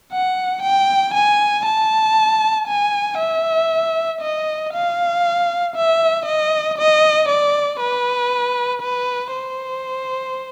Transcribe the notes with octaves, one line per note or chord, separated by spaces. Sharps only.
F#5
G5
G#5
A5
G#5
E5
D#5
F5
E5
D#5
D#5
D5
B4
B4
C5